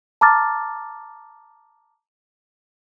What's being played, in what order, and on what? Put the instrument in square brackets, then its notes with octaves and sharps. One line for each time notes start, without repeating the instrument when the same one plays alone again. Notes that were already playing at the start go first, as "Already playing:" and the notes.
[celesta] A5 A#5 D6 F6 A6